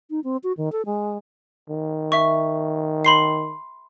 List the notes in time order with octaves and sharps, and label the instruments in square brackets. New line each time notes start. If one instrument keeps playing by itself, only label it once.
[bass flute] D#4
C4
F#4
D#3
A4
G#3
[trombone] D#3
[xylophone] E5 C#6
B5 C6 C7